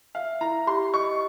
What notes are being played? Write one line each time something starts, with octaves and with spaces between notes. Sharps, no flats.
E5 F5
E4 A#5
G4 C6
D#5 C#6